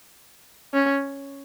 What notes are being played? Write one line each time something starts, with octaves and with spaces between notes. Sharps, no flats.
C#4